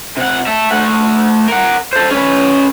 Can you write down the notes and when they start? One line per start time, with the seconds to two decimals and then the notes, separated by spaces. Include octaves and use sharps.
0.17 C3 F#5
0.47 E5 A5
0.71 A3 F#5
1.48 A#4 F#5
1.93 A4 C5
2.11 C#4 B4